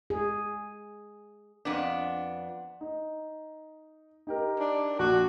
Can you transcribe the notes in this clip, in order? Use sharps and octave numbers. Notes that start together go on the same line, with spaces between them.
G#4
F2 B3 D4
D#4
D#4 G4 A#4
D4
A#1 F#4 D6